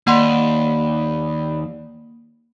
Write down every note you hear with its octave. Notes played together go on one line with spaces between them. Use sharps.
D#2 A#3 D5 F#5 B5 C6